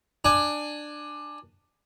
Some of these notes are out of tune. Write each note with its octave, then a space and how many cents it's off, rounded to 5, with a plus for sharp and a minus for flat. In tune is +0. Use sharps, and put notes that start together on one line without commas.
D4 +15 G#5 +0